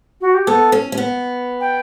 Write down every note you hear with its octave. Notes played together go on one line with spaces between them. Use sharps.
F#4
G4
B3 A4
C#4
C#4
B3
G5